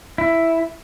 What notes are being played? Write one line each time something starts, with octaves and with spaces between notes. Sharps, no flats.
E4